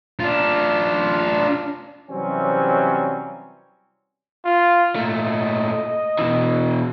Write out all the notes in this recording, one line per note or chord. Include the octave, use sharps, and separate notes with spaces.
D4 F4
C3 E3 F#3 G3 C4 C#4
F4
A#2 A3 D#5
B2 E3